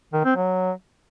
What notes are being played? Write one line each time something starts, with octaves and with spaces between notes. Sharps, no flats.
D#3
C4
F#3